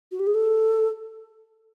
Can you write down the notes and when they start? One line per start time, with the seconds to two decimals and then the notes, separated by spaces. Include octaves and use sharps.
0.11 F#4
0.19 G4
0.27 G#4
0.34 A4